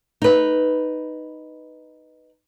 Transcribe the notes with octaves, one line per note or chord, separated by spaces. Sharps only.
D#4 B4